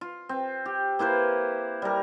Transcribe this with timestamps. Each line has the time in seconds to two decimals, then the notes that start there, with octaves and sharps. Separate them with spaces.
0.01 F4
0.29 C4
0.66 G4
0.99 A#3 E4 B4 C5
1.82 G3 A#4